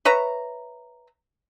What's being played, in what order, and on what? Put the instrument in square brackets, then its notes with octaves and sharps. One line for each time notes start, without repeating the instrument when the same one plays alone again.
[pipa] B4 C#5 E5 A#5